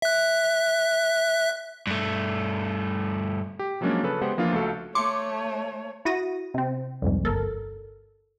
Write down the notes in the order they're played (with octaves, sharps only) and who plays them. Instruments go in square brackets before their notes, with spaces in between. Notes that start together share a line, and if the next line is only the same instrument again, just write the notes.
[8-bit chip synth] E5 F#6
[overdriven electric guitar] G2 A3
[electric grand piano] G4
F3 F#3 G#3 A#3 C#4 D4
C#3 A4 B4
G#3 B3 G4 C5 F#5
E3 F3 A#3 D4 F4
C#2 A3 F#4 A4 F5
[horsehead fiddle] A3 C#5 [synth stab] C6 D6 C#7
[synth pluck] E4 F#4 D#6 A#6
C3 C4
C2 F2 G#2
G1 A4 A#4